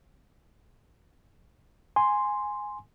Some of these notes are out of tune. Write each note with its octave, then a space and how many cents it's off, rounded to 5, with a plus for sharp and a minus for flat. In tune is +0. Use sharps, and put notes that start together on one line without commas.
G#5 +0 C6 +0